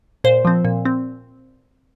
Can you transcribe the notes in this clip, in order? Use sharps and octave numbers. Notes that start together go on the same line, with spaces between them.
A#2 C5
F3 C4
A#2
C4